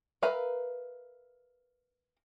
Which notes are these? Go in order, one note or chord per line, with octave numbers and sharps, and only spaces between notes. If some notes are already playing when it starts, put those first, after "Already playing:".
A#4 B4 E5 F5 A#5